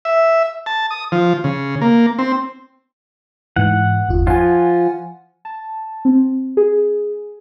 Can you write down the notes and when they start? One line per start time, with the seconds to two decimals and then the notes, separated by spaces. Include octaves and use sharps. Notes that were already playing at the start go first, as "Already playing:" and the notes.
0.05 E5
0.66 A5
0.91 D#6
1.12 F3
1.44 C#3
1.81 A#3
2.19 C4
3.56 G#2 E3 F#5
4.09 G1 E2 F4
4.27 F3 F4 F#5 G#5
5.45 A5
6.05 C4
6.57 G#4